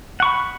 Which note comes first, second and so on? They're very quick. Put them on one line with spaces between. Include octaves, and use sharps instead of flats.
F#5 C#6 B5